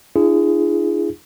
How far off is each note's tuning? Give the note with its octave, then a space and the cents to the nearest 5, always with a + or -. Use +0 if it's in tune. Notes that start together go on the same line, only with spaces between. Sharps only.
D4 +30 F4 -45 G#4 +0